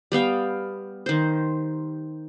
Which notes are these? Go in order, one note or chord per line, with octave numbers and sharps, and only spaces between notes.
G3 B3 F5 G5
D#3 C5